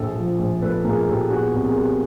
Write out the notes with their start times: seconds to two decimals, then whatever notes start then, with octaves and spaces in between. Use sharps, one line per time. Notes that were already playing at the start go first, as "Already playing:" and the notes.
Already playing: A#1 A4
0.16 F3
0.39 A#1
0.61 A#2 A4 B4
0.84 A#2 G#4 A#4
1.07 A#1 G4 A4
1.30 B3 F#4 G#4
1.53 C2
1.65 G#4 A#4
1.76 G3